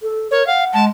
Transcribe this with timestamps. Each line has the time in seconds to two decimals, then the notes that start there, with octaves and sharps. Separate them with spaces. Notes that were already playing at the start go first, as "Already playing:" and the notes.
0.03 A4
0.31 A#4 C#5
0.47 F5 F#5
0.73 G#3 A5